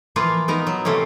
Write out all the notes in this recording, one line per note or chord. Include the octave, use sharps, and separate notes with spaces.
E3 F3 A#3 F4
B3 D#4 A#4
F#3
C3 A3 A#3 C#4